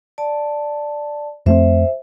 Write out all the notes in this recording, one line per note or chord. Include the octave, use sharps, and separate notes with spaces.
D5 A5
F2 A3 C4 C5 E5